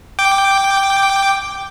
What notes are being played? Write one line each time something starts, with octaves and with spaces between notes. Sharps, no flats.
G5 D6